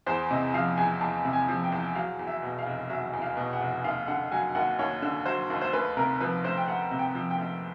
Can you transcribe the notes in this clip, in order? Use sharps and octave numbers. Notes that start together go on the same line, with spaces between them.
E2 C5
C3 D#5
F3 F5
E2 G#5
E2 A5
C3
G#5
F3
G5
E2
F#3 F5
E2
E5
B2
F5
F1
F#3 E5
E2
F5
B2
F#5
F1
D#2 F5
D3 F#5
F#3 G#5
D#2 F#5
D#2 C#5
D3
F#3 C5
D#2
C5
D2 B4
C3 A#4
F3 B4
D2 C5
G5
D2 F#5
C3
G5
F3
G5
D2